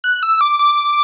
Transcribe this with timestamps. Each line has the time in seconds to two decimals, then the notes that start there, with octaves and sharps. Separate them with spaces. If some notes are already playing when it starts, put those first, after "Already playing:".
0.04 F#6
0.23 E6
0.41 D6
0.59 D6